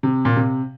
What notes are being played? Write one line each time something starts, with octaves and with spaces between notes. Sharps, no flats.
C3
A#2
C3